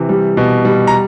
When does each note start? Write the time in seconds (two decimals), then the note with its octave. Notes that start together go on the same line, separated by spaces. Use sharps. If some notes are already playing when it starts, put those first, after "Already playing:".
Already playing: C3 E3
0.09 G3
0.37 B2
0.65 G3
0.87 A#5